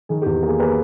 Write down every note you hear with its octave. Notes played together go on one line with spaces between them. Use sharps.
D#3 G#4
G4
E2
A#3 G#4
A#3 G#4 B4